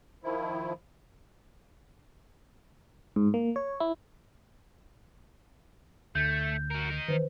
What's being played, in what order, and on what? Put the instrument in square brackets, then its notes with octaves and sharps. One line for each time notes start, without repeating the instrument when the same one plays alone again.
[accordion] D#3 F3 E4
[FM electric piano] G#2
A#3
C#5
E4
[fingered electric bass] D2 [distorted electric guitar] A3 [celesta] G6
[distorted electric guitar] F#4 A#4
D#4 A#4
[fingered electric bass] D#3 E3 [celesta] B4 C5